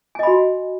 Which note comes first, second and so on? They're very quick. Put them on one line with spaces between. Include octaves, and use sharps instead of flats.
G#5 D#5 B5 F#4